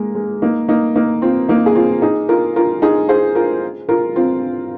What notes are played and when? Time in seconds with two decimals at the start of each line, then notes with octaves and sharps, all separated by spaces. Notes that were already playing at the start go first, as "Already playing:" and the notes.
Already playing: G#3 A#3
0.15 G#3
0.42 A#3 D#4
0.68 A#3 D#4
0.96 A#3 D#4
1.22 C4 F4
1.49 A#3 D#4
1.66 G#4
1.75 C4 F4
2.02 D#4 G#4
2.29 F4 A#4
2.56 F4 A#4
2.82 D#4 G#4
3.09 G#4 C5
3.35 F4 A#4
3.89 F4 A#4
4.16 C4 F4